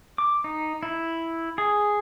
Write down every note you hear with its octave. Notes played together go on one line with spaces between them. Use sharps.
D6
D#4
E4
G#4